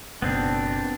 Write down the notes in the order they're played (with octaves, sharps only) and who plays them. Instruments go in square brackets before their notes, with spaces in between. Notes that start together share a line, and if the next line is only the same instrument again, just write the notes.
[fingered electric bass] F#1 B2 [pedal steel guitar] B3 C4 D4